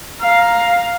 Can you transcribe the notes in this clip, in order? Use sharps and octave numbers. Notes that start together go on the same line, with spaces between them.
F5 A#5